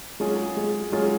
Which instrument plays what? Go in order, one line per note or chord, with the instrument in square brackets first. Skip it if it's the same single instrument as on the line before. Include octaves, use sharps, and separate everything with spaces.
[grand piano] F#3 C#4 F4 G#4 [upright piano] G#3
[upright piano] G#3
[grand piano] F#3 C#4 F4 G#4 [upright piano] G#3